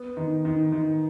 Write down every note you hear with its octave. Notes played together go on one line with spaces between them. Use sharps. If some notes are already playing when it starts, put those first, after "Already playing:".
Already playing: B3
D#3
D#3
D#3